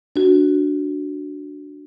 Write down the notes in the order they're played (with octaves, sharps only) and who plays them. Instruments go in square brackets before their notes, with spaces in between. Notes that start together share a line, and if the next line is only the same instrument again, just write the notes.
[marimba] D4 F#4